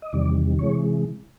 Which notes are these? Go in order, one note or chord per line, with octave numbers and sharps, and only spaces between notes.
D#5
E2 C3 D#3 G3 D5
C3 E3 G#3 C#5